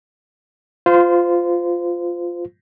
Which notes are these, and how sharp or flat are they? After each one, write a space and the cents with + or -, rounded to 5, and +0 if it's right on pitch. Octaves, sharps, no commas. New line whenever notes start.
F4 +0 C5 -25